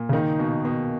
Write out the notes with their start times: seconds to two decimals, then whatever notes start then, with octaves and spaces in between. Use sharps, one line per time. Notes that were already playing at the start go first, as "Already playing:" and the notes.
Already playing: A#2
0.09 C#3
0.13 D#3 D#4
0.39 B2
0.65 B2